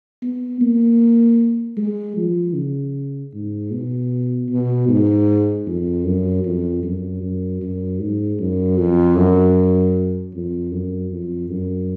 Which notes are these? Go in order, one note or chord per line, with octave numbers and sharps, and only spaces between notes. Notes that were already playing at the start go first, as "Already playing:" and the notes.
B3
A#3
G#3
F3
C#3
G#2
B2
B2
G#2
F2
F#2
F2
F#2
F#2
F#2
G#2
F#2
F2
F#2
F2
F#2
F2
F#2